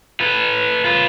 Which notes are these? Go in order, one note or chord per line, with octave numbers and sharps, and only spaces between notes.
A4 B4
F4 B4